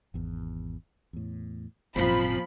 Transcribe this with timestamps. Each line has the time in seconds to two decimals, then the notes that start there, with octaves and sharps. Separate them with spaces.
0.14 G#1 E2
1.13 E2 A2
1.96 G#1 F#2 A#2 F3 C4 B5